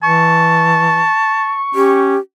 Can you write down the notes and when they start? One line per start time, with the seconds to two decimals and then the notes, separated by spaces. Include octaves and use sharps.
0.03 E3 A5 C#6
1.75 C#4 G4